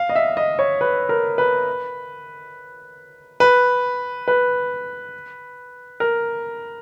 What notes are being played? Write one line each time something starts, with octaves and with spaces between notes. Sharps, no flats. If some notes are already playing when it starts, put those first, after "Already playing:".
Already playing: F5
D#5
E5
D#5
C#5
B4
A#4
B4
B4
B4
A#4